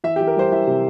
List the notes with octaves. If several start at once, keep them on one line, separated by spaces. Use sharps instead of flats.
E3 E5
G4
E3
A#4
G3 C5
E3 E5
C3